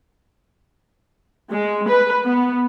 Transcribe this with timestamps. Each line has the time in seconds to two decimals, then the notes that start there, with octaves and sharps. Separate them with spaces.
1.51 G#3
1.88 B4
2.24 B3